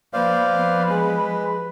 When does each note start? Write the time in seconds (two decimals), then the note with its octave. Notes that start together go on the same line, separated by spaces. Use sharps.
0.13 F3 A#3 B4 C5 D5 F5
0.55 B3
0.89 G#3 G#4